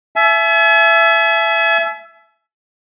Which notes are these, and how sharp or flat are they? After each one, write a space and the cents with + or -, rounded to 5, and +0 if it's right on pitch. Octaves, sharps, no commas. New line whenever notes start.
E5 +15 G#5 +45